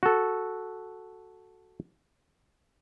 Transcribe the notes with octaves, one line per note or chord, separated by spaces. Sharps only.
F#4 A4